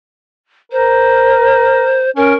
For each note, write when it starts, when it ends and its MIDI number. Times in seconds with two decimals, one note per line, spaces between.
0.72 2.03 70
0.72 2.10 72
2.16 2.34 61
2.16 2.36 70